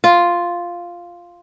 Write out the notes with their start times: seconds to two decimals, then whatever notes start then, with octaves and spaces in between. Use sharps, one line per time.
0.04 F4